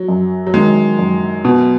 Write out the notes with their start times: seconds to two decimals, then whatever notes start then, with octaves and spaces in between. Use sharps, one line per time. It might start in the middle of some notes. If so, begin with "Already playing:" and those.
Already playing: F#3
0.08 F#2
0.47 F#3
0.54 D#3 G#3
0.99 F#2
1.44 B2 B3